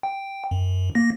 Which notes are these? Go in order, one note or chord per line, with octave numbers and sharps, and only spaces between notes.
G5
F#2
A#3 A#6